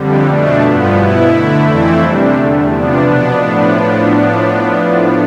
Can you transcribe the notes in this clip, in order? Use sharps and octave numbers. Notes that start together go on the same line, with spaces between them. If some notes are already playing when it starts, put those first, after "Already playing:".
Already playing: F2 D3 G3
B2 A3 D4
G2 F3 B3
B2 B3 E4
D3 A3 E4
F2 E3 A3 C4 E4
C3 G3 D4
E2 D3 A3
C3 F3 B3 D4
B2 B3 D4
A2 F3 B3 D4